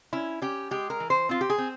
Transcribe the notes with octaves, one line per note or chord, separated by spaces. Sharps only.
C#4 E4
C#4 G4
G#3 G4
A#4
E3
C5
C4 F4
G4
G#4
C4